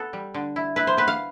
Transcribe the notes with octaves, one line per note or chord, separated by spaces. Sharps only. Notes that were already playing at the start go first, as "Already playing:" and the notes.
Already playing: B3 A4
G3
D3
E4
E4 B4
C5
B3 B4
F5